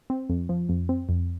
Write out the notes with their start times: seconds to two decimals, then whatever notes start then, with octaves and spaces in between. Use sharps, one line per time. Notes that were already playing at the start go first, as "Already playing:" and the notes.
0.10 C4
0.29 F2
0.49 F3
0.69 F2
0.89 C4
1.09 F2